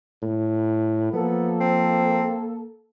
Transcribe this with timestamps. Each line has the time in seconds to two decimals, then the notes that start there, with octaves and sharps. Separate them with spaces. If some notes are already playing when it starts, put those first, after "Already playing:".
0.22 A2
1.13 F3 A#3 B3 A4
1.60 C4